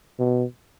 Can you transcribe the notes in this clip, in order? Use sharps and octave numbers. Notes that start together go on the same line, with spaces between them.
B2